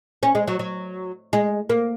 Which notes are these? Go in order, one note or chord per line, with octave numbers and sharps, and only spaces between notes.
C#4
G#3
F#3
F#3
G#3
A#3